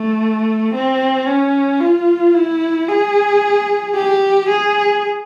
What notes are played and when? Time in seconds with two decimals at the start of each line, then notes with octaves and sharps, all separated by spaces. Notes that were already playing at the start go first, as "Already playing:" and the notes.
Already playing: A3
0.74 C4
1.27 C#4
1.81 F4
2.34 E4
2.88 G#4
3.95 G4
4.49 G#4